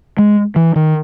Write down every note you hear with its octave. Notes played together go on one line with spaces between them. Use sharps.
G#3
E3
D#3